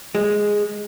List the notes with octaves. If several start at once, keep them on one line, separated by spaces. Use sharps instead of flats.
G#3